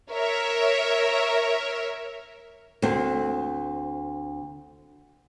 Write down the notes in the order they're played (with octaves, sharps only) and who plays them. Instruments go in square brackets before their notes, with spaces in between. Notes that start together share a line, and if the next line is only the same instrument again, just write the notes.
[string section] A#4 C#5 E5
[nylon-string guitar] D2 C4